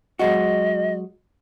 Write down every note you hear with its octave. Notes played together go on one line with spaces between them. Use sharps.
F#3 G#3 F#4 D#5